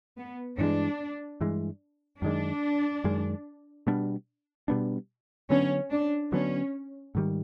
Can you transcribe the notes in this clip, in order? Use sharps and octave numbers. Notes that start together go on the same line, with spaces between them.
B3
G2 E3 G#3 D4
G2 E3 G#3
F#2 D#3 G#3 D4
F#2 D#3 G#3
B2 G3 B3 D4
B2 G3 B3 D4
D3 F#3 B3 C#4 D4
D4
D3 F#3 B3 C#4 D4
G#2 D#3 G3